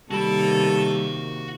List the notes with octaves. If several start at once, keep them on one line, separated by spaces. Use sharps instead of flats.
C3 D#3 G3 A#3 F#4 A4 B5